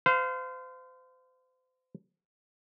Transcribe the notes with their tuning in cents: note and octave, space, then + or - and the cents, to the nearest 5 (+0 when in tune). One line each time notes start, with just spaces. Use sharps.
C5 -35 F5 +0